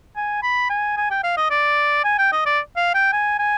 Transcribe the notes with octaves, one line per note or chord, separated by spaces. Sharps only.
G#5
B5
G#5
G#5
G5
F5
D#5
D5
G#5
G5
D#5
D5
F5
G5
G#5
G#5